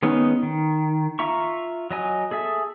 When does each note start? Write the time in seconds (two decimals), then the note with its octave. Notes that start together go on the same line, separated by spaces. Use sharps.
0.03 D#3 G#3 B3 C#4 D#4
0.43 D#3
1.19 F4 E5 A#5 C#6
1.91 F#3 D#5 G#5
2.31 G#4 A4 E5